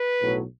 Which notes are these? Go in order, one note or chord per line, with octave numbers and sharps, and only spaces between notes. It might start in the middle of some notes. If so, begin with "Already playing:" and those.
Already playing: B4
B1 A2 F#3